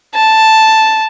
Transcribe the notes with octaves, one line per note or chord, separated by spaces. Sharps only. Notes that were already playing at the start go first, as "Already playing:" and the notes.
A5